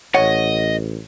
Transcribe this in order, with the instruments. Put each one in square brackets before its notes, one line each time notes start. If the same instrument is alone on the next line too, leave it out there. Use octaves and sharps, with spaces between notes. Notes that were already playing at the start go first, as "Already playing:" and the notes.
[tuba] A1 [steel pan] C#5 [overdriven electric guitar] D#5 [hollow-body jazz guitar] F#5